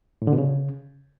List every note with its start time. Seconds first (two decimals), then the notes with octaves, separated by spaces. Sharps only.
0.22 A2
0.27 D3
0.33 B2
0.38 C#3